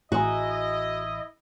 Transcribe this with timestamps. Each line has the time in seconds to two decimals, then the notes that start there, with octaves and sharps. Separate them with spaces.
0.12 A1 G#3 E4 F#4 D#5 A#5